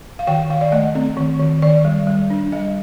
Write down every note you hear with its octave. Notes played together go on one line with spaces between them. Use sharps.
F5
D#3 G5
D#3 F5
D5
A3 D#5
C4
D#3
D#3
D#3 D5
G3
G3
D4
G3 D#5